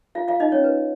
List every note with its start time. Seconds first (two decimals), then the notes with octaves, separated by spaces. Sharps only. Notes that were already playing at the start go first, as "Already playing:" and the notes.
0.15 F4 F5
0.28 F4 F5
0.40 D#4 D#5
0.52 C#4 C#5
0.64 B4